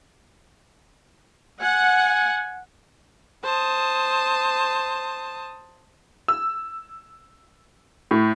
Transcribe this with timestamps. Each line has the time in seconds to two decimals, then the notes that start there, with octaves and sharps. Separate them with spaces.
1.62 F#5 G#5
3.43 C5 A5 D#6
6.28 E6
8.11 A2